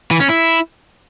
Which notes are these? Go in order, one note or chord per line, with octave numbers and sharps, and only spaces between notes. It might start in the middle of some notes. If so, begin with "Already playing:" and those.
E3
C#4
E4